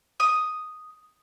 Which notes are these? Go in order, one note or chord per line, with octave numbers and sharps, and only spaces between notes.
D#6